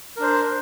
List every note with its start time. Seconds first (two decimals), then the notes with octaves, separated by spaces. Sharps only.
0.17 A#4
0.19 D4
0.22 C5